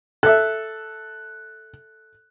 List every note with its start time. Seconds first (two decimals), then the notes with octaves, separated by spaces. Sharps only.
0.23 A4 E5 F#6